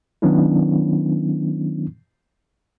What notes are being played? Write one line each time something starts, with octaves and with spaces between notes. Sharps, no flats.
D#3 F#3 B3 C#4 D4 E4